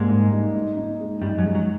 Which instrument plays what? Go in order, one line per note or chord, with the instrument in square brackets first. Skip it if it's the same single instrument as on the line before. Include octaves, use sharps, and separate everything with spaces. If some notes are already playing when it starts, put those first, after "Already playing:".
Already playing: [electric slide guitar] G#2 G#3 [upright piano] G3 A#3
[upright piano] D#4
D#4
D#4
D#4
G#3
[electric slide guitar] G2 G3 [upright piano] D#4
[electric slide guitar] F#2 F#3
[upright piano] G#3
[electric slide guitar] F#3